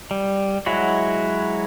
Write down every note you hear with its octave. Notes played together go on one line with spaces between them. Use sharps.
G3
F#3 G#3 E4 F#4